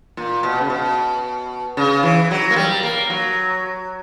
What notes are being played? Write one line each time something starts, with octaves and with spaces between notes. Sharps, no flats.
A#2
B2
C#3
B2
C#3
E3
F#3
A#3
G3
A#3
F#3